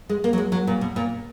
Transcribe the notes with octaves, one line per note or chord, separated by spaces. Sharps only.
G#3
A#3
F#3
G#3
F#3
A#2
B2
A#2